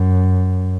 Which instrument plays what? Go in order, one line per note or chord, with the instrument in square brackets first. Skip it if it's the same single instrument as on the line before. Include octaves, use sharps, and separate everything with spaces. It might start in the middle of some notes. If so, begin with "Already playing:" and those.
Already playing: [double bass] F#2